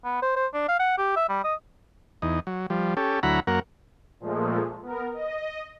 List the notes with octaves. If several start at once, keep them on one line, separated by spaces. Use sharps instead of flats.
B3
C5
C5
D4
F5
F#5
G4
E5
G3
D#5
E2 D#4
F#3
F3 G3
C#4 G4 A4
D2 F#3 E4 F#5 A#5 B5
F#2 A#3 A#4 F#5
A#2 F3 G#3 A3
B3 A#4
D#5